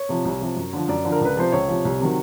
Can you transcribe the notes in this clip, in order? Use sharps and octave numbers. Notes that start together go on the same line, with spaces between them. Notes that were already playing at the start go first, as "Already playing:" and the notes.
Already playing: C#5
C3 F3
C2
C3 F3
F#2
D3 F3
F#2 D5
D3 F3
A#4
C#2 B4
C3 F3 C5
C#2 C#5
C3 F3
C2
C3 D#3 F#3